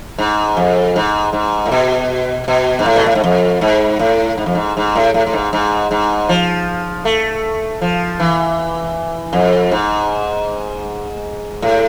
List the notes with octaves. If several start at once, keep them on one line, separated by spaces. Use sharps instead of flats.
G#2
F2
G#2
G#2
A2
B2
B2
G#2
A2
B2
A2
G#2
F2
G#2
A2
G#2
F2
G#2
G#2
A2
A2
A2
G#2
G#2
G#2
F3
A3
F3
E3
F2
G#2
A2